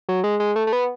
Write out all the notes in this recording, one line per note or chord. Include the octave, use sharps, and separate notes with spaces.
F#3
G#3
G#3
A3
A3
B3